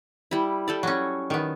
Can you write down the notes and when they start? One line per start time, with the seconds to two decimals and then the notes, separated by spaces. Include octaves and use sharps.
0.31 G3 E4
0.68 G3 A4 D5
0.83 F#3 C#4
1.30 D#3 B3